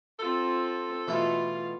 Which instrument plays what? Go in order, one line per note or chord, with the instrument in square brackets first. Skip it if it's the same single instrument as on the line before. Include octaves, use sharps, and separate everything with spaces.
[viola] C4 F4 [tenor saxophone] A4
[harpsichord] B2 E3 A3 [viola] F4 F5